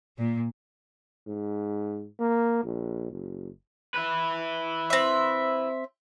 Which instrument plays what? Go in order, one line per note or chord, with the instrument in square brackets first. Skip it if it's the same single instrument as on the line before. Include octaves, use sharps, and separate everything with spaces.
[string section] A#2
[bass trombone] G#2
A#3
A#1
F#1
[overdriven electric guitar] E4 B4
[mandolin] C4 E5